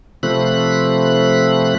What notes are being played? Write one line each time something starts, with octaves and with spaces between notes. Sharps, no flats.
C3 F3 A3 C4 B5 F#6